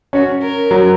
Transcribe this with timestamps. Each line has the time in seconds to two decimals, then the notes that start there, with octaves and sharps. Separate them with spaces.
0.13 C#4 F#4
0.42 A#4
0.71 F#3